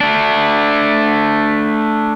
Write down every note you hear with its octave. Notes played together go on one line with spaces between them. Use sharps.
A3 D4